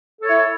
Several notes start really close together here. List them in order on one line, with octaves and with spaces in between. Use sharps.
A4 C#5 E4